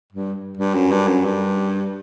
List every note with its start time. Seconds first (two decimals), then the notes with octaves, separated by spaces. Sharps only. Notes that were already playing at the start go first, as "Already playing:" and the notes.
0.13 G2
0.57 G2
0.74 F#2
0.91 G2
1.08 F#2
1.25 G2